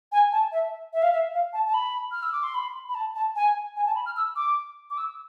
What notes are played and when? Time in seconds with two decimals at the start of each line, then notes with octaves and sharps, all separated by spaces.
0.12 G#5
0.32 A5
0.52 E5
0.93 E5
1.02 F5
1.11 E5
1.33 F5
1.53 A5
1.66 A5
1.74 B5
2.11 F6
2.22 E6
2.32 D6
2.43 C6
2.54 B5
2.89 B5
2.95 A5
3.15 A5
3.35 G#5
3.76 G#5
3.86 A5
3.95 B5
4.06 F6
4.17 E6
4.36 D6
4.90 D6
4.97 E6